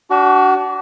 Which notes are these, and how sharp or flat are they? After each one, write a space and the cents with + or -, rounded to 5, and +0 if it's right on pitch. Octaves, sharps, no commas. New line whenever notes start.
D4 -25 F#4 +25